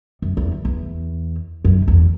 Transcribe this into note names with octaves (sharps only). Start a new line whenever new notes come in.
F#2
E2
E2
F#2
E2